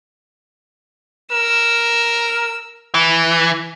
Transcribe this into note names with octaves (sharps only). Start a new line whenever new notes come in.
A#4 E6
E3